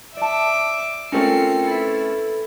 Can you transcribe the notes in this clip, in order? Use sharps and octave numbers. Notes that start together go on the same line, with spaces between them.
D5 E5 A5 D6
A3 C4 C#4 F4 A#4 G5 C7 C#7
E4 A4 B4